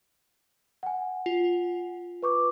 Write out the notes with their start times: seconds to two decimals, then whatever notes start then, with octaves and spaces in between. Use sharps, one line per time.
0.83 F#5 G#5
1.26 F4
2.23 B4 C#6 D6